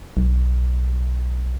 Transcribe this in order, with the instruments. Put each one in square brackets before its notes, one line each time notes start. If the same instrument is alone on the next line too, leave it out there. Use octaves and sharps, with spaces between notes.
[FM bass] B1